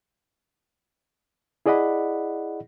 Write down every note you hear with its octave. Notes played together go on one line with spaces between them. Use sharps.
E4 G#4 D5 D#5 F#5 B5